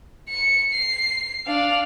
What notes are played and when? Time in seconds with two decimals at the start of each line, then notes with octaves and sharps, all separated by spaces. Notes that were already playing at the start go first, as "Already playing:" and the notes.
0.29 C#7
0.73 C7
1.46 D4 F5